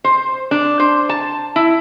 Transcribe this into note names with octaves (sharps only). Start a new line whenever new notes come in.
C5
D4
C5
A5
E4